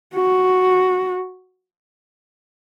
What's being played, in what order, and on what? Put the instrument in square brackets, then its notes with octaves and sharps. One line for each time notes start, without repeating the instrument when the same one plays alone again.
[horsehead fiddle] F#4